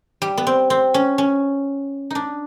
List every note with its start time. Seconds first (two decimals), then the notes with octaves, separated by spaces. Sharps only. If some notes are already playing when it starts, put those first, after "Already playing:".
0.22 G3
0.38 B3
0.47 C4
0.70 C4
0.94 C#4
1.18 C#4
2.10 D4 D#4